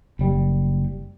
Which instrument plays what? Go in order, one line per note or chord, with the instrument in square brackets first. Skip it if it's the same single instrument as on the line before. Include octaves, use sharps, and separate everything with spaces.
[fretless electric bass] F#1 G3